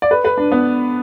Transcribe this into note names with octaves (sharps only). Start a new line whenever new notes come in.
D5
B4
B4
D4
B3